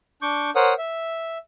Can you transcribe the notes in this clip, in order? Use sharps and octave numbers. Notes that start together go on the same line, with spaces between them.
D4 C#6 D6 G6
A#4 C5 C#5 F#5 D#6
E5